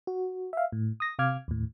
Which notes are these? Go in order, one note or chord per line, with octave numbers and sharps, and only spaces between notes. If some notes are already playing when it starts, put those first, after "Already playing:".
F#4
E5 F5
A2
D#6 A#6
C3 F5 D6 F6 G#6
D#2 A2